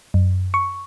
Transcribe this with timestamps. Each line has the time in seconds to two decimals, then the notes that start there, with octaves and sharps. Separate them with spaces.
0.14 F#2
0.54 C#6